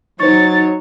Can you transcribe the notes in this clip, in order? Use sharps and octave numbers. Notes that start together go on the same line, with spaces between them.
F#3 D#4 C5 C#5 C#6 A6